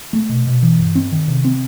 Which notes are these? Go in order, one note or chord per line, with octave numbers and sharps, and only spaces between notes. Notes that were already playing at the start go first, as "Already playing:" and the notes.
A3
B2
B2
E3
G2
C4
D#3
C3
C4